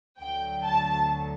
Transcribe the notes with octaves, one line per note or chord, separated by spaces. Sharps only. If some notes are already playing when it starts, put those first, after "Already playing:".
D2 D3 F#3 G5
A5